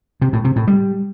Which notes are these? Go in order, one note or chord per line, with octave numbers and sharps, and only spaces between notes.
C3
A2
C3
A2
G3